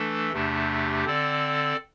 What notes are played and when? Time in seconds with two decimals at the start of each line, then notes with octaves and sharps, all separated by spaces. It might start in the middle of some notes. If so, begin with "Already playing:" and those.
Already playing: E3 A3 D4 A4
0.33 E2 C3 A3 D4 G4
1.05 D3 C4 A4 D5